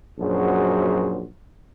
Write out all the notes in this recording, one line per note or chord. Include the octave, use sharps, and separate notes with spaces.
A#1 F#2 F#3 F#4 G#4 C5